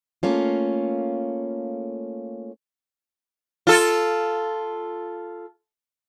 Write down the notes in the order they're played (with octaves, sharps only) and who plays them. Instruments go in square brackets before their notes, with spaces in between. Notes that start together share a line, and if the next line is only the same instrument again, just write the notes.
[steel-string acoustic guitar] A3 A#3 C#4 F4
[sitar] F4 A4